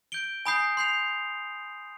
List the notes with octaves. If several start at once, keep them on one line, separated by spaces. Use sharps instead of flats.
G6 D7 G7
G#5 B5 D#6 G6 C7
C6 G6 C7 F7